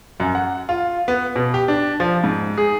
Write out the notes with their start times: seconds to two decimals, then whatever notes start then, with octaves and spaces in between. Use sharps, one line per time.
0.20 F#2
0.35 F#5
0.69 F4
1.08 B3
1.36 B2
1.54 G4
1.68 D4
2.00 F3
2.24 G#2
2.58 G#4